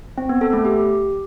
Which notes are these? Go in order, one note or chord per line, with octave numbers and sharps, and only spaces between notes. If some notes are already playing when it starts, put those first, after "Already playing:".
C4
B3
A4
A3
G4